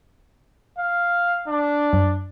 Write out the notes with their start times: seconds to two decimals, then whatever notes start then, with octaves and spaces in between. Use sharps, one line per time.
0.78 F5
1.48 D4
1.93 F#2